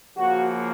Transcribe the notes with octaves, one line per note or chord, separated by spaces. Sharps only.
C#3 F3 A#3 F#4